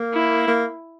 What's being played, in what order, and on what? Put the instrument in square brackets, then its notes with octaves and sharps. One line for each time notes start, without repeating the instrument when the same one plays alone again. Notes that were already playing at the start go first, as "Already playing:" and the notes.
Already playing: [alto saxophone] A#3
[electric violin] E4
[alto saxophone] A#3